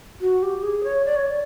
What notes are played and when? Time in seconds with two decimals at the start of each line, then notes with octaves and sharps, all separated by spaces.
0.21 F#4
0.43 G4
0.63 G#4
0.84 C#5
1.05 D5
1.16 C#5
1.26 D5